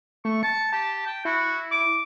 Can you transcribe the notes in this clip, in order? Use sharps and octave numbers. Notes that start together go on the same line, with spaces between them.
A3 C#6
A5 C#7
G4 A5
G5
E4 F#4
D6